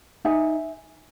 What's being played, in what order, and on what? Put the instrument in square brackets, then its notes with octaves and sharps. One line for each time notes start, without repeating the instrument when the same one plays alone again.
[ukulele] D#4 E5 G#5